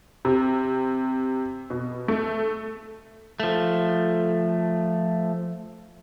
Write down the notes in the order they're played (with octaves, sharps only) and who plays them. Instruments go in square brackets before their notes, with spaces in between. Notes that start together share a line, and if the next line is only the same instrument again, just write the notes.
[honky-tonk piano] C3
B2
A3
[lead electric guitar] F3 A3